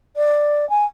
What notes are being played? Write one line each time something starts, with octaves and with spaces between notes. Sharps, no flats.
D5
G#5